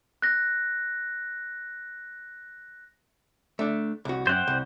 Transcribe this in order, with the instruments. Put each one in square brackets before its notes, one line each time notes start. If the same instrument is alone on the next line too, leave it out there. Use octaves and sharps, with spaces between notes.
[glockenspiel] F#6 A#6
[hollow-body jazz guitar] A3 D4
C2 F#4
[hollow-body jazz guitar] F#2 C#4 [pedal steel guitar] C5 F#5 G5
[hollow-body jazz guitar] C2